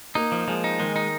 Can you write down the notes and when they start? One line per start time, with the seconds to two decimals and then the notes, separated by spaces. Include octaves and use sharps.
0.15 A#3 D#4
0.32 F3
0.48 F3 G#3
0.64 D#4
0.80 D#3 G#3
0.96 D#4